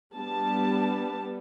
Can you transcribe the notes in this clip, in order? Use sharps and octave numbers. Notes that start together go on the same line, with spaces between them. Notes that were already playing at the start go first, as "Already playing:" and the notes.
G3 B3 D4 A5